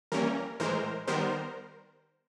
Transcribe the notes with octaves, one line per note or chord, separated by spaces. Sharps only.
E3 G3 A#3 C#4 A#4
A2 E3 G#3 A#4 C5
D#3 G3 B3 A#4 C5